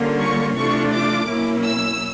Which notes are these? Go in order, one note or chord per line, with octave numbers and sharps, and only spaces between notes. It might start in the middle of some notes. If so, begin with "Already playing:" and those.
Already playing: D3 G3 A#3 C#4 F4
C#6
C3 E3 A3 D4 F4 C#6
D6
B2 F#3 A#3 C#4 E4
E6